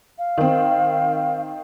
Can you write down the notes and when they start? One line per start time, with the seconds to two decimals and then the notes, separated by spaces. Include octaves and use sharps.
0.18 F5
0.38 D#3 C4